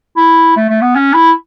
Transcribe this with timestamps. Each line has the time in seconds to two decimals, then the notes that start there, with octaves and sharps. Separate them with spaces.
0.17 E4
0.56 A3
0.70 A3
0.81 B3
0.95 C#4
1.14 E4